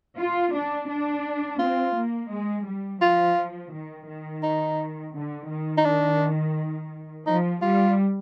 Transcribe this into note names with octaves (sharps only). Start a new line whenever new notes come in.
F4
D4
D4
C4 F4
A#3
G#3
G3
F3 F4
D#3
D#3
D#4
D3
D#3
D#4
D4
F3 D#4
G3 F4